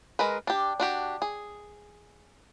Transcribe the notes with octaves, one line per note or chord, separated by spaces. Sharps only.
G#3 A#4 B4
D4 G4
D4 F#4 G4
G#4